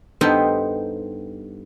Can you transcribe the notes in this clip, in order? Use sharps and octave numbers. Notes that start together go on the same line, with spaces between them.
G2 B3 D#4 A4 C5 G5